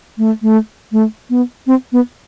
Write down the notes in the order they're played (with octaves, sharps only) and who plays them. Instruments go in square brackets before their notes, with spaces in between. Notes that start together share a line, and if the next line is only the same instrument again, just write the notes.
[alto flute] A3
A3
A3
B3
C4
B3